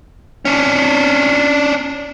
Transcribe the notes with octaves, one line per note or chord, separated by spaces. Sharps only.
C#4 D4